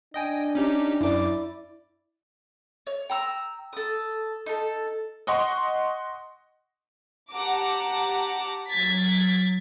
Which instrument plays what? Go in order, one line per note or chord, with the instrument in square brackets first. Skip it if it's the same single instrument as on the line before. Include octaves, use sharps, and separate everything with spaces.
[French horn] D4 [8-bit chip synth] D#5 G5 G#5
[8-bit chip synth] C#4 D#4 G4
[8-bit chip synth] F#2 D6 [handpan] E4 D5
[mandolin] C#5
G5 A#5 E6
A4 D#6
D#4 A4
[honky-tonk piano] D#5 F#5 C6 C#6
[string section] G4 F#5 A5 A#5 D6
F#3 G#6 A6 B6